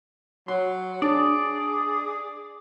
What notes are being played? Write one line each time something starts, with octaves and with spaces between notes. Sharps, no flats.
F#3 C6
D4 G#4 D5